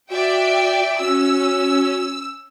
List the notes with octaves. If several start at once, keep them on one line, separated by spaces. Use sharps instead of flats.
F#4 D5 E5 G5
C#4 F#4 E6